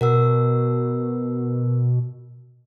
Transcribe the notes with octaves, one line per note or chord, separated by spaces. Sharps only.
B2 A#4 F#5 E6